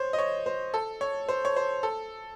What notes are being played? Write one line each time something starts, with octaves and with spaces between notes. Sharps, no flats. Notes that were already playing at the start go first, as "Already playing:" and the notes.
Already playing: C5 C#5
D#5
C#5
C5
A4
C#5
C5
C#5
C5
A4